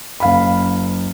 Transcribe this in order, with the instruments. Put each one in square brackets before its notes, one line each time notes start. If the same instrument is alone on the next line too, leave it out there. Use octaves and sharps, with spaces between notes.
[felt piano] F#1 F5 B5